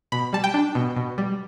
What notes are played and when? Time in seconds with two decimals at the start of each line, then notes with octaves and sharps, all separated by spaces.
0.12 B2 B5
0.33 G3 A5
0.44 G5
0.54 D4
0.75 B2
0.97 B2
1.18 G3